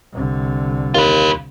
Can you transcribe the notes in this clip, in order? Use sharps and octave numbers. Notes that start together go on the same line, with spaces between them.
C2 D3
D#2 F4 B4